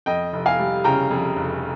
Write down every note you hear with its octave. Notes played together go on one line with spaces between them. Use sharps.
F2 D#5 G5
F1
F5 G#5
G3
C#3 G5 A#5
F2
F1